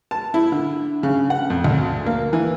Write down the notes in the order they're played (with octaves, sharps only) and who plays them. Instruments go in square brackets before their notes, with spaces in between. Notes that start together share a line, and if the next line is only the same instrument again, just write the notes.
[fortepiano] A5
E4
D3
C#3
F#5
F2
D2
A#3
E3